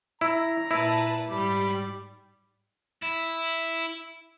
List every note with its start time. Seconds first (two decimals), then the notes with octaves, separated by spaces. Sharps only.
0.21 E4 A#5
0.71 A#2 E4 B4 A5
1.30 G#2 G3 B5 D6
3.03 E4